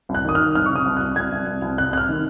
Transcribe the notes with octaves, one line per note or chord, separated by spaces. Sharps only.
C2
F#6
D#3 D#6
D#3 F6
C2 F6
C#6
C3
D#6
C2
C2 F#6
C2 G#6
C2
C2
C2
C3 F#6
C3 F#6
F6
D#3